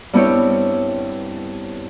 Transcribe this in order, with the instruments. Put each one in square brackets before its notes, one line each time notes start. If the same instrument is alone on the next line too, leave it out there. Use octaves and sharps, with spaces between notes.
[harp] G2 B3 C4 E4 G4 C#5